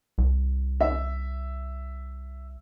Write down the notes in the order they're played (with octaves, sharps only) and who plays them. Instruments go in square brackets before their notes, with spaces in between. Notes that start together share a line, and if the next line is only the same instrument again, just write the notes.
[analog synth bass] C2
[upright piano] E5